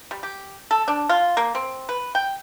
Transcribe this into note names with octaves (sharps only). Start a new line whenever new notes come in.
G3
G4
A4
D4
F4
A#3
C4
B4
G5